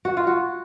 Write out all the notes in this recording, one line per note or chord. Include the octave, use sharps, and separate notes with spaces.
F#4
F4
F#4